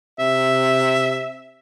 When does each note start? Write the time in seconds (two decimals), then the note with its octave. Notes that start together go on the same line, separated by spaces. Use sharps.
0.19 C3 E5